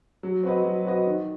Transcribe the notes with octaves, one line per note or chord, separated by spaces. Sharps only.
F#3
C4 F#4 B4 D#5
F#3
C4 F#4 B4 D#5
D#3